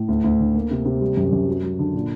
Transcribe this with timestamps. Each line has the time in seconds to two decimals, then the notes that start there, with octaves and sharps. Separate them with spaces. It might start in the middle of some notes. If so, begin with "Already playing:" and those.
Already playing: A2
0.08 D2
0.24 D2
0.40 D3
0.55 A#3
0.71 C3
0.85 C3
1.01 G3
1.17 F#2
1.33 F#2
1.48 F#3
1.63 F#3
1.79 D3
1.94 A#2